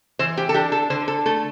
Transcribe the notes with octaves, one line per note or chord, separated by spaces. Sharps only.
E3 C5
G4
A4
D4 G4
A4
D3 C5
A4
A3 A4